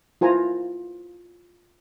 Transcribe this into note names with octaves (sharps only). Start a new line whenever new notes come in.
E4 F4 C5 G#5 A#5